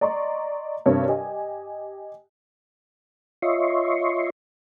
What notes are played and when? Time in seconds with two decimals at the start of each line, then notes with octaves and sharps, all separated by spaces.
0.01 D5 D#5 A#5 C6 C#6
0.86 G2 C3 A#4 C#5
1.08 G4 D#5 G#5
3.42 F4 C#5 D#5 E5 C6 C#6